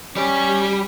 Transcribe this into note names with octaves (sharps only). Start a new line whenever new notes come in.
G3 C#4 D5